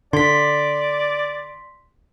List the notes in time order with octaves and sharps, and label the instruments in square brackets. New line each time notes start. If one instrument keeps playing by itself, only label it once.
[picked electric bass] D3 [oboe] D5 [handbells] C6 B6